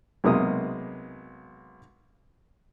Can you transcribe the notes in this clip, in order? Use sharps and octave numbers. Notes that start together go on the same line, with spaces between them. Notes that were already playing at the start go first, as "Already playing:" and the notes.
B1 C3 G#3 A#3 D#6